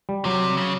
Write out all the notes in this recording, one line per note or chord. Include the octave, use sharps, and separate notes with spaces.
G3
C3 F#3
C#3